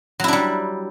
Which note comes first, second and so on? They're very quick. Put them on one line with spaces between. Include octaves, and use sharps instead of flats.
F#3 E4 D4 G3